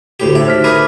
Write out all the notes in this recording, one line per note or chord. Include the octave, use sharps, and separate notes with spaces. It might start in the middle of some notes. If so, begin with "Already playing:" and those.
D2 A2 G4
D#4 C5 D5 E5
F6 B6
G#4 A#4 B4 D6